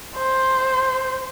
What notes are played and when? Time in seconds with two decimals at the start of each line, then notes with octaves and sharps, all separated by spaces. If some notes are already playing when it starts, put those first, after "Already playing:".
0.17 C5